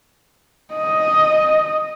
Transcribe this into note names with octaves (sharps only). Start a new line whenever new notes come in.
D#5